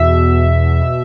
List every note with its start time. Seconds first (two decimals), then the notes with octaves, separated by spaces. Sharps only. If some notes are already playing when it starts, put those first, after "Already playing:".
Already playing: E2 B2 E5
0.81 B2